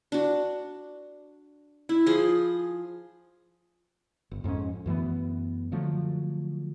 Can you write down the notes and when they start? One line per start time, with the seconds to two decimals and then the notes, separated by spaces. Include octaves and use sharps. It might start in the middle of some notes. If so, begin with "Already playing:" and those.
0.12 D4 F#4
1.89 E4
2.06 F3 G#4
4.31 G1
4.44 F2 G#2 G#3 C#4
4.86 F#2 E3 A3 B3
5.72 D3 F3 F#3 A3